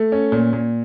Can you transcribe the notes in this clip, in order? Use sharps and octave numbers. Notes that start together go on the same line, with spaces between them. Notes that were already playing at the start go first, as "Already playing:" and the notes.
Already playing: A3
C#4
A#2
A#2